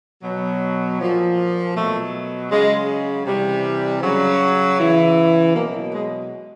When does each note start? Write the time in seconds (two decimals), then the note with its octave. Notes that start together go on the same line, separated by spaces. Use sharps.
0.23 B2 F#3
0.99 A#2 F3
1.74 B2 F#3 A3
2.50 C#3 F#3 G#3
3.26 C3 E3 G3
4.03 C#3 F#3
4.78 C#3 E3
5.54 B2 F#3 A#3
5.93 G#3